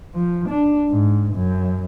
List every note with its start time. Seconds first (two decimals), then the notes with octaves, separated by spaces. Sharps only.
0.15 F3
0.49 D4
0.90 G#2
1.34 F#2